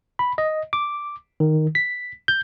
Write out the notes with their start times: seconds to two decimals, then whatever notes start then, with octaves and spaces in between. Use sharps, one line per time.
0.19 B5
0.38 D#5
0.73 D6
1.40 D#3
1.75 B6
2.28 G6